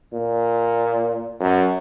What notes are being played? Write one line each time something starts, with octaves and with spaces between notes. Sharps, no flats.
A#2
F#2